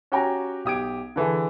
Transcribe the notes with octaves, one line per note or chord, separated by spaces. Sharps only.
C#4 F#4 G4 G5 G#5 A#5
B1 G4 D#6 G#6 D7
D3 E3 G#4 A4